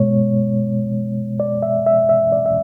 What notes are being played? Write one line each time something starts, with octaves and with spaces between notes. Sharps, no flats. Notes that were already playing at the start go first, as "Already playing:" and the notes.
Already playing: B2 G#3 B3 C#5
D5
E5
E5
E5
D5
E5